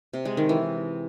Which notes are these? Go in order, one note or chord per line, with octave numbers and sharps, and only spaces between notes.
C3
G#3
D#3
E3